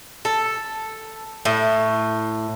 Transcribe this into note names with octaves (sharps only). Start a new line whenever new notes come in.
A4
A2